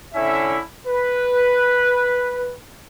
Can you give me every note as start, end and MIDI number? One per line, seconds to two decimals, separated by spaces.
0.14 0.58 50
0.14 0.58 61
0.14 0.58 64
0.14 0.58 76
0.86 2.54 71